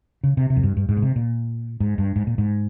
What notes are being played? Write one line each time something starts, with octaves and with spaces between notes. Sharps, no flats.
C#3
C3
C3
F2
G2
G2
G#2
A#2
C3
A#2
G#2
G2
G#2
A#2
G#2